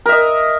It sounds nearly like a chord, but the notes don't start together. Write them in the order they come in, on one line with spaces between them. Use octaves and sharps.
A#4 E5 D#5